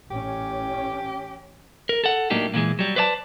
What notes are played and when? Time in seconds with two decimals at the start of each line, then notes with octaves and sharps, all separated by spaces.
0.11 A1 C#4 G4
1.89 A#4
2.04 A4 F#5
2.30 A2 F#3 A#3 D4 D#4 G4
2.54 A#2 D3 E3 G#3
2.79 F#3 G3
2.96 B4 C5 D5 E5 A5